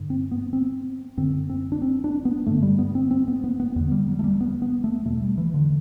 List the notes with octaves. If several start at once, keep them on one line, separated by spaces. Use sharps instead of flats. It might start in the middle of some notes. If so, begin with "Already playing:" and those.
Already playing: G2 D3
C4
B3
C4
F#2 D3 C4
C4
D4
C4
D4
B3
G2 D3 A3
G3
B3
C4
C4
B3
B3
B3
E2 D3 B3
G3
F#3
A3
G3
B3
B3
A3
E2 B2 A3
G3
E3
D3